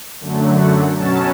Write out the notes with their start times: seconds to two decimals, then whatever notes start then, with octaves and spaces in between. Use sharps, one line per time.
0.20 F#2 D3 F#3 A3
0.58 F#5
0.97 B2 F#3 C#4 A5